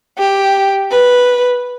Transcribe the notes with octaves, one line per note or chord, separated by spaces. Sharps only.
G4
B4